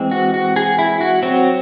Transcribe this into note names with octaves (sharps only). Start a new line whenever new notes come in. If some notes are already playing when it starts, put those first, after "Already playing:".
Already playing: E3 G#3 C4
F#4
F#4
G#4
E4
F#4
F#3 C4 F#4